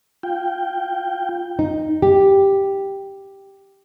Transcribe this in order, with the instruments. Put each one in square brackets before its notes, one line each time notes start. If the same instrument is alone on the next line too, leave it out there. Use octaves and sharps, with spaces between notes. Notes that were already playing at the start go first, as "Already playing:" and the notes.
[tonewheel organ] F4 G5
[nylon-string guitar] D#4
G4